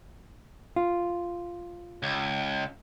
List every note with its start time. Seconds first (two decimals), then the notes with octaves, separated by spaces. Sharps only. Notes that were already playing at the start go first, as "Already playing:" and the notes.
0.76 F4
2.03 C#2